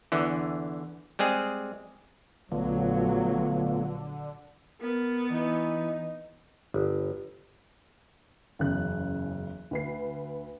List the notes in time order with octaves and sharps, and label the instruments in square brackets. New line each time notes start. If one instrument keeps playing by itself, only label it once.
[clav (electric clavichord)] E2 D3 E3
G3 G#3 C4 G#4
[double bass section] A#1 F#3 [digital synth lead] D3 [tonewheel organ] A3 B3 F4
[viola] B3 [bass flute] A#4
[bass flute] E3 [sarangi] D#4
[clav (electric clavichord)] G1
[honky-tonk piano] F#1 E2 C#3 F#6
D2 B4 C7